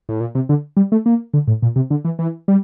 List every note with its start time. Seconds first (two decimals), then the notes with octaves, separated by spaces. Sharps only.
0.09 A2
0.20 A#2
0.35 C3
0.49 D3
0.77 G3
0.92 A3
1.06 A#3
1.34 D3
1.48 A2
1.62 A#2
1.76 C3
1.90 D3
2.05 E3
2.19 E3
2.48 G3